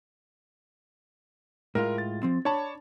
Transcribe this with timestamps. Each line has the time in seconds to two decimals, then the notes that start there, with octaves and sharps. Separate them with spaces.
1.75 A2 G#3 F4 A#4
1.98 A6
2.23 F3 C4
2.45 D4 C#5 A5 B5